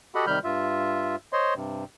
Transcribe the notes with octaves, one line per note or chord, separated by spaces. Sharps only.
F#4 G4 A4 D#5 F#5 B5
C3 D#3 G3 B5 F6 G6
G2 F4 E5
C5 C#5 D#5 C6
G2 C3